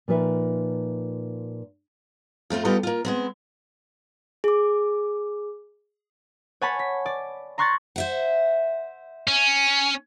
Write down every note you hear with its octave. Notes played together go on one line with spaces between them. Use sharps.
A#2 F3 D#4 B4 E5
F2 A3 C4 F4
G3 B3 F4 G4 A4 D#5
A#3 F4
G#3 B3 C4
G#4 D6
C#5 F#5 G#5 A5 B5
B6
D5
A#5 C6 C#6 F#6 G#6 A6
C5 E5 F#5
C#4